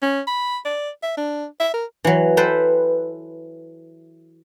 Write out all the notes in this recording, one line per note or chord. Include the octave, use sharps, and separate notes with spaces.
C#4
B5
D5
E5
D4
E5
A#4
E3 F#3
A4 B4 C5 G5